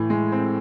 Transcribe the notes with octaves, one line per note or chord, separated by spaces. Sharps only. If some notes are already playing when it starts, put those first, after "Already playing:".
Already playing: A2 E3
G#3
C4